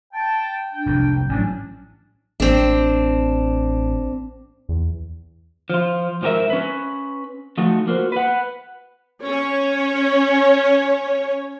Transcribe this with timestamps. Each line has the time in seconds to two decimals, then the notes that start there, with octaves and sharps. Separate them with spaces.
0.13 G5 A5
0.73 D4 G5
0.86 F1 C2 G#2
1.29 A1 A2 F#3 C#4 D4
2.40 A1 C4 D4
4.69 E2
5.70 F3 F4
6.22 G#2 F3 G4 A#4 E5
6.50 C#4 B4
7.58 F3 A3 D#4 F#4
7.87 A#3 F4 F#4 C5
8.12 B4 F#5
9.22 C#4 C#5